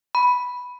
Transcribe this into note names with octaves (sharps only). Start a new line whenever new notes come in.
B5